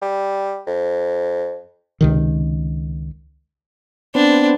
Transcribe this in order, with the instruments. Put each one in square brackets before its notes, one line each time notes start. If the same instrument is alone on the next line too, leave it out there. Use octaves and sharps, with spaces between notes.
[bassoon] G3
F2
[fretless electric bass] C#2 C3 D#3
[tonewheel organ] B3 C4 [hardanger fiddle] D4